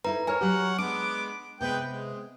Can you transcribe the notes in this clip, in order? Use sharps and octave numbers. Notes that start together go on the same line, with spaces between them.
D#4 E4 A4 B4 A#5
A#4 C#5 G#5 A#5 F6
F#3 G4 C#5 F#5
G#3 B3 D4 D6 D7
C3 G#3 B3 C4 B4 G5
G#3